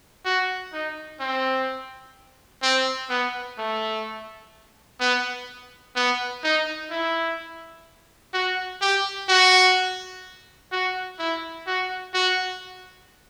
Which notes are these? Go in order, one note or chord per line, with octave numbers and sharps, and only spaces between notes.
F#4
D#4
C4
C4
B3
A3
B3
B3
D#4
E4
F#4
G4
F#4
F#4
E4
F#4
F#4